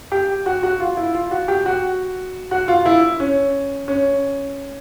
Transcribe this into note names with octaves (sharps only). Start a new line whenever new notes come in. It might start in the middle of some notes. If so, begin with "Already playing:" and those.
G4
F#4
F#4
F4
E4
F4
F#4
G4
F#4
F#4
F4
E4
C#4
C#4